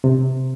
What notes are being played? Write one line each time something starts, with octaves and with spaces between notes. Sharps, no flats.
C3